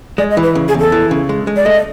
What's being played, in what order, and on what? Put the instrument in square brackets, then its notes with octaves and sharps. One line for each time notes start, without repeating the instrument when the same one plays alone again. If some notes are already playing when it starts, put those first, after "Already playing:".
[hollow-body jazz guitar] G#3 [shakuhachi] D5
[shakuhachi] D#5
[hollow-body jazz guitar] E3
[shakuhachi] B4
[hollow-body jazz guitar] C#3
[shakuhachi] G#4
[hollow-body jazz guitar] E2
[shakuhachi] A4
[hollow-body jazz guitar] E3
C#3
G#3
G#3
[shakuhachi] D5
[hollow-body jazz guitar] A3 [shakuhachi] D#5